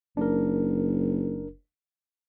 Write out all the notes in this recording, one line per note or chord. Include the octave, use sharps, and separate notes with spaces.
F#1 D4 A#4